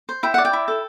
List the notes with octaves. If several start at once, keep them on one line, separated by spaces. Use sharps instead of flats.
C5
E4 G5
D5 F#5
G5
E4
A4